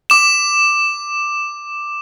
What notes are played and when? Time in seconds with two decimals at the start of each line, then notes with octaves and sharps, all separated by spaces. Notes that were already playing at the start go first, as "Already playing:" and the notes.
0.10 D6 E7